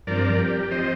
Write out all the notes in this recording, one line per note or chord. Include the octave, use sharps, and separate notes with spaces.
G2 F3 C4 A#4 D5
G4
F3 C4 C5 D#5